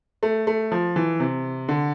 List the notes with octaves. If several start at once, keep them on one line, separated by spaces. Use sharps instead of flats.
A3
A3
F3
E3
C3
D3